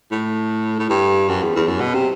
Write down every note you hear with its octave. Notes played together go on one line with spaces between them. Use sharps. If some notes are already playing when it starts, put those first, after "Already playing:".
A2
A2
G2
F#2
E2
E2
F#2
B2
C3